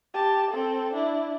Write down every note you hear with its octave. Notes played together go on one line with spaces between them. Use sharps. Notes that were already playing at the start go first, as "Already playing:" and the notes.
G4 A5
C4 A4
D4 E4